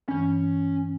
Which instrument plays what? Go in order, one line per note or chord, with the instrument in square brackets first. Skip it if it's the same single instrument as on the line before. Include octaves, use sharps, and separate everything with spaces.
[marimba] G2 E3 [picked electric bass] C#4